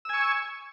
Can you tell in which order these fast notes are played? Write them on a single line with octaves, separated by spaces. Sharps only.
E6 G#5 C#6